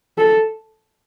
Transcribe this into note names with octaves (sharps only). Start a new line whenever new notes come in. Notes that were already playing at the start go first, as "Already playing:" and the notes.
A4